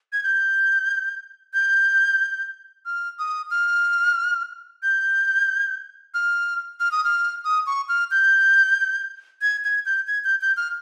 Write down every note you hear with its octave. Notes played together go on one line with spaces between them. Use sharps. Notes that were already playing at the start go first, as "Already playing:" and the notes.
G#6
G6
G6
F6
D#6
F6
G6
F6
F6
D#6
F6
D#6
C#6
F6
G6
G#6
G#6
G6
G#6
G6
G6
F6